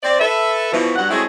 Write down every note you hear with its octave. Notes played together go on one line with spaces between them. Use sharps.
C4 D5
A4 B4 E5
B2 E3 F3
G2 F#3 F#5
F#3 G#3 A3 C4 E4 G#4